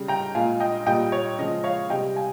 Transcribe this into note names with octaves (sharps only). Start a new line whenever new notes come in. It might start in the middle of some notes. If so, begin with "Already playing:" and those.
Already playing: C#3 G3
G5 A#5
A#2 G#3 F5 G#5
D#5 G5
A#2 G3 D#5 G5
C#5
C#3 F3 G#3 D#5
C#5 F5
C3 G3 D#5 G5
F5 G#5